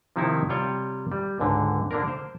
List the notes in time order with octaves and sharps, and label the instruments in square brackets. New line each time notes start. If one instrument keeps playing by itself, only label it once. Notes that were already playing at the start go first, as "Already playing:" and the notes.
[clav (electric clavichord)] C3 D#3 F3 A#3 D#4 E4
C3 G3 F4 C#5 G5
G3
C#2 G#2 D3
D3 A#3 D4 A#4
C5